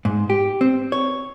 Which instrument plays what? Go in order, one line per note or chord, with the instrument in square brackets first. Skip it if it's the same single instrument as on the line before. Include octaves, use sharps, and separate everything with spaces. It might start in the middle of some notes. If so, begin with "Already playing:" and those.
[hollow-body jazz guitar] G#2
G4
C4
C#5